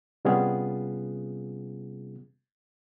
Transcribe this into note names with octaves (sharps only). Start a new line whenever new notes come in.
C3 G3 B3 C#4 F4 G#4